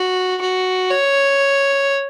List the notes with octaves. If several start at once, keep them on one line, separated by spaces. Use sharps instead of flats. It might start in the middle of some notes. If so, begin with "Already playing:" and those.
Already playing: F#4
F#4
C#5